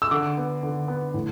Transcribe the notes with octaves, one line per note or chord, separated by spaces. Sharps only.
E6
D3 D6
B3
D3
B3
A2